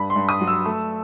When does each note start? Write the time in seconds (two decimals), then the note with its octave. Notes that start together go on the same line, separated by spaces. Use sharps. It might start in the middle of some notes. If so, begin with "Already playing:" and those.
Already playing: G2 B5
0.10 C6
0.16 G2
0.29 D#6
0.41 F#3
0.47 E6
0.65 A3